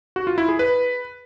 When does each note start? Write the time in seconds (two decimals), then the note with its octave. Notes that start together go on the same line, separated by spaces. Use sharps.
0.16 F#4
0.27 F4
0.38 E4
0.49 G#4
0.59 B4